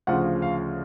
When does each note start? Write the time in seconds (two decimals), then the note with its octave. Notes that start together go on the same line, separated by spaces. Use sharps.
0.07 D2 C#3 F3 F#5
0.42 F5